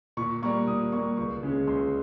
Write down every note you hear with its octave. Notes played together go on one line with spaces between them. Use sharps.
A#2 C#6
G3 A#3 C#6
A#2 D#6
G3 A#3 C#6
C#2 C#6
C#3 G#3 C#4
C#2 C6